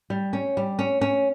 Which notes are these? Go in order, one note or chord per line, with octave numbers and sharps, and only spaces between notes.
G3
C#4
G3
C#4
C#4